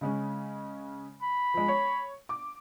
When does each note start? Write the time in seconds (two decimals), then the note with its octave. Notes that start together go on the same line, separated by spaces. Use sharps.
0.01 C#3 G#3 C#4
1.22 B5
1.54 F3 G#3
1.68 C#5
2.29 D6